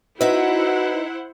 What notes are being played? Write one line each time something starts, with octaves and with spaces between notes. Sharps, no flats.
D#4 E4 F#4 B4 C5 E5 F#5